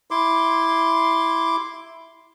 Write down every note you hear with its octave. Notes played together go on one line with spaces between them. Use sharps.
E4 C6 D6